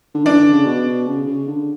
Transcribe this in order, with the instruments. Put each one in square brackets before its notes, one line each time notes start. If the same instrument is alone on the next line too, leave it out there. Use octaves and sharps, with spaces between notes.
[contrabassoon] D3
[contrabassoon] E3 [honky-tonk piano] D4
[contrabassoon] D3
C#3
B2
C#3
C#3
D3